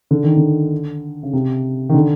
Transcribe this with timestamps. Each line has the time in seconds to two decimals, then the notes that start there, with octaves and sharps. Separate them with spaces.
0.11 D3
0.24 D#3
0.37 D3
1.23 C#3
1.33 C3
1.89 D#3
1.94 D3